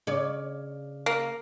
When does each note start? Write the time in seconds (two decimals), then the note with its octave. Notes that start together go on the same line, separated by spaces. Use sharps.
0.07 C#3 C#5 D5
1.06 A#3